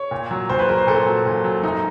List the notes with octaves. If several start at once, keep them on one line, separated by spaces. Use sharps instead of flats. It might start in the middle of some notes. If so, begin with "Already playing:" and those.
Already playing: C#5
A#2
F#3
A#2 C5
B4
F#3 A#4
C5
A#2 A4
F#3
A#2
F#3
F#2 D#4